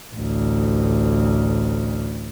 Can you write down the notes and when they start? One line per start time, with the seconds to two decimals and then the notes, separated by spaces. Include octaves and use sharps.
0.14 A1 D2